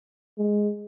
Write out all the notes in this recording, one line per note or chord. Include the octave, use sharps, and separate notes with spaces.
G#3